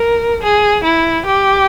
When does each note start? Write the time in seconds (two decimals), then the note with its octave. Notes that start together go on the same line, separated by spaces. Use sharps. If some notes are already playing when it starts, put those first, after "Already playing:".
Already playing: A#4
0.43 G#4
0.84 E4
1.26 G4